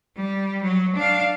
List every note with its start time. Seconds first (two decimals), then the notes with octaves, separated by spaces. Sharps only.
0.16 G3
0.63 F#3
0.96 D4 F5